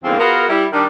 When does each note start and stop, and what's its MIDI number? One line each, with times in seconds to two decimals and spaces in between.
0.04 0.19 40
0.04 0.19 44
0.04 0.19 50
0.04 0.19 53
0.04 0.19 58
0.04 0.19 60
0.19 0.47 59
0.19 0.47 65
0.19 0.47 66
0.19 0.47 68
0.19 0.47 70
0.49 0.65 55
0.49 0.65 64
0.73 0.87 51
0.73 0.87 55
0.73 0.87 62